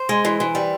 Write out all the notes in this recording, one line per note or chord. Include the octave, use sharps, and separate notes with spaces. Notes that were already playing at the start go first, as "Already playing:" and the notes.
Already playing: C5
G#3
E3
E3
G3